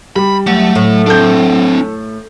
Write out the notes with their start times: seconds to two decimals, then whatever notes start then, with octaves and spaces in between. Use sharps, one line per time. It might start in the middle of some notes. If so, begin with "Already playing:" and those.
0.16 G3 B5
0.47 E2 F#3 A3
0.75 A2
1.06 C4 D4 A4 G6